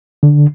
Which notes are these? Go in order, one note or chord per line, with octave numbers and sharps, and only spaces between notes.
D3